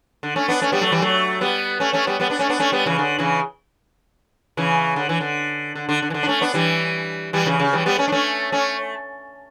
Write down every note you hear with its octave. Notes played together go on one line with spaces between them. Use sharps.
D3
A3 C#4
B3 D4
A3 C#4
G3 B3
F#3 A3
E3 G3
F#3 A3
G3 B3
A3 C#4
A3 C#4
G3 B3
G3 B3
B3 D4
A3 C#4
B3 D4
A3 C#4
G3 B3
C#3 E3
D3
C#3 E3
C#3 E3
D3
E3
D3
D3
D3
D3
E3
D3
D4
A3 C#4
B3 D4
E3 G3
E3 G3
C#3 E3
C#3
E3 G3
G3 B3
A3 C#4
D4
A3 C#4
A3 C#4